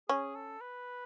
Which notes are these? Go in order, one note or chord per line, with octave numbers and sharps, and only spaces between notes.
C#4 G#4
A4
B4